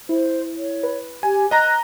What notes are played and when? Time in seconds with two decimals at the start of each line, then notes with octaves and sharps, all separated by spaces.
0.09 E4 C5
0.57 C#5
0.83 B4
1.23 G4 G#5
1.51 D#5 A#5 F#6 A#6